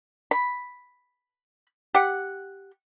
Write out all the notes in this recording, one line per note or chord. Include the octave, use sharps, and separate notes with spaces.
B5
G4 F#5